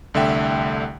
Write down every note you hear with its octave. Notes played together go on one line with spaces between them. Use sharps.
C2 D3 A3 E5 G5